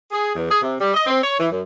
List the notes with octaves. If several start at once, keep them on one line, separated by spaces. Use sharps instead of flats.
G#4
E2
G#4
C3
G3
D#5
C4
C#5
E3
F#2